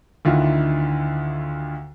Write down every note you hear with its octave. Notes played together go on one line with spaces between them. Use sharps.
D2 D3 D#3 E4 F4